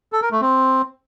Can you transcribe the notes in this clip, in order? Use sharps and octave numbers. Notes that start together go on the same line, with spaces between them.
A4
A#4
A3
C4